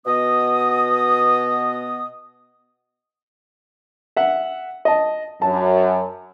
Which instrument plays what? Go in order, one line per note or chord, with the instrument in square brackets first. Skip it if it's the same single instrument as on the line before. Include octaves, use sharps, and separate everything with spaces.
[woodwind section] B2 B3 D#5 D#6
[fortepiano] E5 F#5
D#5 A5
[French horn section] F#2 [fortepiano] A5